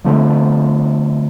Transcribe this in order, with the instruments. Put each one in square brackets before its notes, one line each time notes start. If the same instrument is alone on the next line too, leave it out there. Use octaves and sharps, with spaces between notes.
[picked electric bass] D3 F3 A3 C4